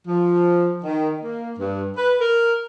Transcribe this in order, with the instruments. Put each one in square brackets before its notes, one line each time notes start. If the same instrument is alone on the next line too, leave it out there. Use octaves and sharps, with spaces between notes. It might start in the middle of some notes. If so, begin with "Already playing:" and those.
[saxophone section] F3
D#3
A#3
G2
B4
A#4